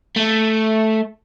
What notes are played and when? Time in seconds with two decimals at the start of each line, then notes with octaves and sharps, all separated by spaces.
0.17 A3